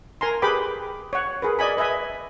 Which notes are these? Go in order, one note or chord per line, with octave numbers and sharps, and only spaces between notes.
A#4 G#5 A#5 C6
G4 G#4 B4 G5 B5 D6
C#5 F#5
G#4 A#4 B4
D5 D#5 G#5 B5
B4 D#5 E5 G#5 B5